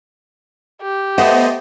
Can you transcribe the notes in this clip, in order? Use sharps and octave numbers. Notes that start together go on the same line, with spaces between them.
G4
A3 B3 C5 D#5 F#5